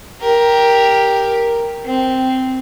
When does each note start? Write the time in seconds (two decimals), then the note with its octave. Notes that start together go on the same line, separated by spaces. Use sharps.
0.21 G4 A#4
1.85 C4